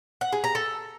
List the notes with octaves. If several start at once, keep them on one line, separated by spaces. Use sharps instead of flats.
F#5
G#4
A#5
A4